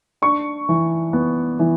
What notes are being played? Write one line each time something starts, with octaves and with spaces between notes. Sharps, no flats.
D4 C#6
E3
B3
E3